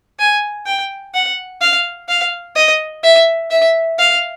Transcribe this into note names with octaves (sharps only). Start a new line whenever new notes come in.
G#5
G5
F#5
F5
F5
D#5
E5
E5
F5